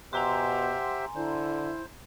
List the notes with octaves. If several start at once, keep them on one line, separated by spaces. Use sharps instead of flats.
B2 G4 C5 E5 F#5 G#5 A#5 C6
D3 E4 C5